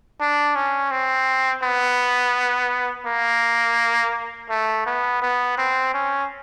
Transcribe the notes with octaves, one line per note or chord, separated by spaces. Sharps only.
D4
C#4
C4
B3
A#3
A3
B3
B3
C4
C#4